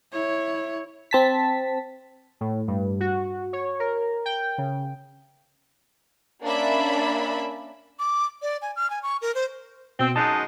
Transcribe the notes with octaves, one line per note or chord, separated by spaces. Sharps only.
E4 C#5
C4 A5 B6
A2
G2
F#4
C#5
A#4
G5
C#3
A#3 C#4 D4 D5 E5 B5
D6
D5
G#5
F6
G#5
C#6
A#4
C5
B2 C4
F#2 G#3 D#4 A5